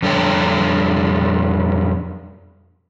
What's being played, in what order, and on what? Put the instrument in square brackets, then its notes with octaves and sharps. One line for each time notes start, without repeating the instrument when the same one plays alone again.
[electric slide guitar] F2 G3 D4 A4 C#5 G5